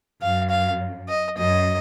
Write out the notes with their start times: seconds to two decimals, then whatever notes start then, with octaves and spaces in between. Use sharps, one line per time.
0.22 F#2 F5
0.50 F5
1.09 D#5
1.36 F#2 D#5